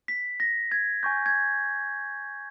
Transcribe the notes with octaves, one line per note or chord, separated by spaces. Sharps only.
B6
A#6
G#6
G#5 C#6 G6
G#6